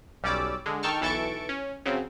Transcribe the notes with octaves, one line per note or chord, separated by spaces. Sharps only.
B1 G3 C#4 D5 D6 E6
D3 G#3
D#3 A4 G5 A5 C#6 F6
B1 E3 A4 A5 C#6 D7
C#4
C#3 F#3 C4